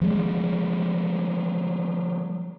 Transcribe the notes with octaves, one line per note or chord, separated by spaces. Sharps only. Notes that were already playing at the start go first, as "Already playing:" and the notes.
F3 G3 G#3